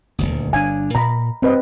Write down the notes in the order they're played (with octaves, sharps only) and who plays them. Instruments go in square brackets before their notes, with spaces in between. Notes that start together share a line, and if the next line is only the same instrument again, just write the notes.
[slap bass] D#1 G#1 D2
[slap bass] G1 D4 [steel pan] F5 G#5
[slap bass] A#2 [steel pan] A#5 B5
[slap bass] G2 [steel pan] C4 B4 D#5